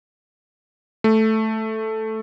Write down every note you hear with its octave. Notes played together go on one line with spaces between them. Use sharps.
A3